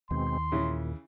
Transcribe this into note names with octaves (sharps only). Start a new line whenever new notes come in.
D#2 B2 G#3 C4 C6
A#2 C#3 E3 E4